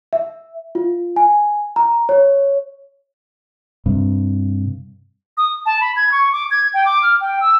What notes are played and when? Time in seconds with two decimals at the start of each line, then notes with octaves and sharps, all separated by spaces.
0.13 E5
0.75 F4
1.16 G#5
1.76 A#5
2.09 C#5
3.86 G2 C3
5.37 D#6
5.66 A5
5.81 B5
5.96 G#6
6.12 C#6
6.33 D6
6.51 G#6
6.74 G5
6.85 D6
7.03 F6
7.21 G5
7.41 E6